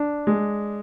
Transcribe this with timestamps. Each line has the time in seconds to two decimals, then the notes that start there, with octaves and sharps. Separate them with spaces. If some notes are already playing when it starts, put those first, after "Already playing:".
Already playing: D4
0.27 G#3